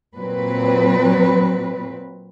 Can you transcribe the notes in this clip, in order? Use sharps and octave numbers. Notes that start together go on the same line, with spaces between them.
A#2 F#3 C4 B4